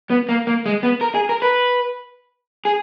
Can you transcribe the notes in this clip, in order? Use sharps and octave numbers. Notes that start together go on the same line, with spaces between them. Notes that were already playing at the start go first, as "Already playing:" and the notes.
B3
A#3
A#3
G#3
B3
A#4
G#4
A#4
B4
G#4